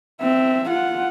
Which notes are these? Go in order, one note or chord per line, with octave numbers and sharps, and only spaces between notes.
C4 E5
F4 F#5